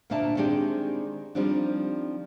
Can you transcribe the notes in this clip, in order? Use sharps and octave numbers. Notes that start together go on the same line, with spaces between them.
D2 A#2 A#3 D4 E5 A5
D#3 G#3 C4 D4 G4
D#3 F3 G3 C4 D4